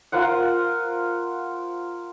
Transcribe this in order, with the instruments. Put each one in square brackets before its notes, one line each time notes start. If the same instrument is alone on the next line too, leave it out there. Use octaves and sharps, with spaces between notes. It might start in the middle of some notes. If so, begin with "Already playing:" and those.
[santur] F4 A#4 C5 F#5